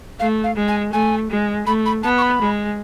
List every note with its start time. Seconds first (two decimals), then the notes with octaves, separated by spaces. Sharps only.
0.20 A3 F5
0.44 F5
0.56 G#3
0.68 G#5
0.93 A3 G#5
1.30 G#3
1.67 A3 B5
1.86 B5
2.03 B3 A5
2.18 C#6
2.22 B5
2.41 G#3